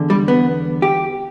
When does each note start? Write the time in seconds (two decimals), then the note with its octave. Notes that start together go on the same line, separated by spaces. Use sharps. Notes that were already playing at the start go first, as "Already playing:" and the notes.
Already playing: E2 D3
0.10 G3
0.28 B3
0.82 G4